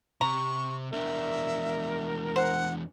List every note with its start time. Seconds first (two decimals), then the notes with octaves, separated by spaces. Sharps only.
0.21 C3 A#5 C#6
0.92 E2 D4 A#4 E5
2.36 C5 F#5